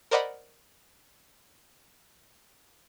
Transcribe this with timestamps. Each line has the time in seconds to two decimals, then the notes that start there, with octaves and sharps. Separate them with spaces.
0.11 A#4 C5 D5 D#5 F#5 B5